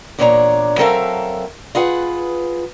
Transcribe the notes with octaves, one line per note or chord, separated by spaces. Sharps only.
E2 A#2 D4 C#5 G#5 A#5
F#3 C4 A4 A#4 E5 F5
F4 G#4 B4 F#5